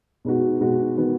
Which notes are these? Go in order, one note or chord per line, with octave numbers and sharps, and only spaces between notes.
B2 G#3 B3 D#4 F#4
B2 G#3 D#4 F#4
D#3 B3 F#4